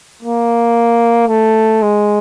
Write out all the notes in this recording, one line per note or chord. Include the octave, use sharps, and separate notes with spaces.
A#3
A3
G#3